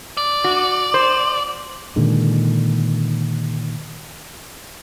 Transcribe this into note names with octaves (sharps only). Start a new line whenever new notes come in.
D5
F#4
C5
A#2 D3 D#3 G#3